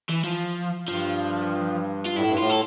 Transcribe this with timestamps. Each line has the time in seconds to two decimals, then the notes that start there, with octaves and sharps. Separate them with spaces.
0.09 E3
0.24 F3
0.88 G2 F3
2.06 F4
2.16 A2 E4
2.28 G2
2.38 A2 F4
2.50 A4